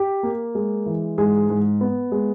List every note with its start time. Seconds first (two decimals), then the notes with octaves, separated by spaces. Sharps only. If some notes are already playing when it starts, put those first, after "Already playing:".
Already playing: G4
0.23 A#3
0.55 G#3
0.86 E3
1.18 G#2 G#4
1.49 G#2
1.81 B3
2.12 G#3